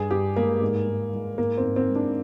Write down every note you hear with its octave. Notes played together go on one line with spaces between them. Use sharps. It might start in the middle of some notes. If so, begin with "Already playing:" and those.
Already playing: G2 G#4
G2 G4
G#3 A#3
G#2
G#2
G#3
G#2 A#3
C4
G#2
C4
G#3
D4